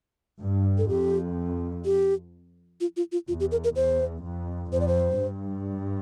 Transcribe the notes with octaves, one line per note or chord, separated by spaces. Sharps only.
G2
A4
F2 G4
G4
F4
F4
F4
E2 F4
G4
A#4
A#4
E2 C5
F2
F2 C5
D5
C5
G2